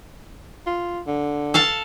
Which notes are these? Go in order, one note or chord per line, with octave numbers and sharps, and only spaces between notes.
F4
D3
A4 F5 A5